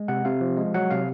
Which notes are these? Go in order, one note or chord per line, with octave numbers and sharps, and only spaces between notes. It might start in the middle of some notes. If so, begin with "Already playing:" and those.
Already playing: G#3
C3 F#5
C3 F5
F3
G#3
F#3 F#5
C3 F5